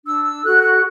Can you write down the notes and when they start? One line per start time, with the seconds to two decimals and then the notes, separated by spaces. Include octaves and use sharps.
0.06 D4 E6
0.24 E6
0.44 F#4 A4 F#6
0.62 F#6